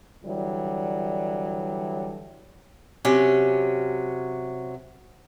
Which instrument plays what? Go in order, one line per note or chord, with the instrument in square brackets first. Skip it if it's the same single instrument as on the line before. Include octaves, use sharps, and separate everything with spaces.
[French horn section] D3 E3 F#3 G3
[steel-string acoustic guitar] C3 F#3 C#4